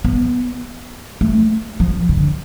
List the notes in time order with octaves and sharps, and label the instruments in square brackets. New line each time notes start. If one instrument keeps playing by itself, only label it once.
[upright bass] B3
A3
F3
D3